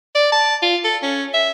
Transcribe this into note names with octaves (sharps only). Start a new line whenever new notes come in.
D5
A5
F4
A4
C#4
E5